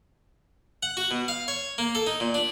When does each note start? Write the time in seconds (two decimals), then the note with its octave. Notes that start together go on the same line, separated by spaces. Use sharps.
0.83 F#5
0.97 F#4
1.11 B2
1.28 F5
1.48 C#5
1.78 A#3
1.95 A4
2.07 D#4
2.20 A#2
2.34 D4